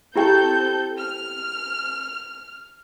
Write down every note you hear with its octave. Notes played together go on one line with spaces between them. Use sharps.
C4 E4 G4 A4 G5 G6
F6